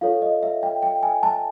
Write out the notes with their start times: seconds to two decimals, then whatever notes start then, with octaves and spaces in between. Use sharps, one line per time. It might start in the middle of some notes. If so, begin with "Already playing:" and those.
0.01 F4 A4 C#5 F5
0.22 D#5
0.43 E5
0.63 G5
0.83 G5
1.03 G#5
1.23 A5